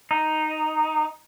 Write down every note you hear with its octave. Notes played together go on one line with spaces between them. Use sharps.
D#4